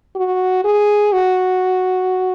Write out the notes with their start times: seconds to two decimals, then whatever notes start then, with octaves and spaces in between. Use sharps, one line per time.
0.16 F#4
0.64 G#4
1.13 F#4